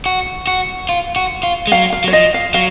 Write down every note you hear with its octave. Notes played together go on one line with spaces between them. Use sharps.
F#4
F#4
F4
F#4
F4
G#3
F#3 F5
F5
F#3
C#5
F3 D#5
F5
F#3 F5